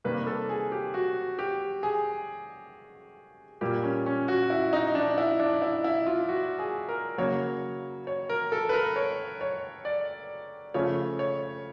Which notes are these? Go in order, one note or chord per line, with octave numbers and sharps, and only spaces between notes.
C3 D#3 G3 A#3 B4
A4
G#4
G4
F#4
G4
G#4
A#2 G3 A#3 G4
C#4
C#4
F#4
E4
D#4
D4
E4
D4
E4
E4
F4
F#4
G#4
A#4
C#3 F#3 A#3 C#5
C#5
A#4
A4
B4
A#4
C#5
C#5
D5
C#3 F3 A3 C#5
C#5